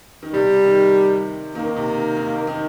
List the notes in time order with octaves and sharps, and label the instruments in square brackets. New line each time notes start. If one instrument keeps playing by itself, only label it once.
[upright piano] D#3
[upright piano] C3 [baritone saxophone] G3
[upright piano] D#3
[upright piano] D#3 [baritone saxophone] A#3
[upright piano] D#3
C3
D#3
D#3
D#3